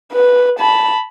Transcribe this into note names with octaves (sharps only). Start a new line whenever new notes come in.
B4
A5 B5